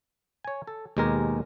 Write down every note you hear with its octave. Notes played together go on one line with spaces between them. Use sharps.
C#5 G#5
A4
D#2 B2 G#3 G4 A#4 G#5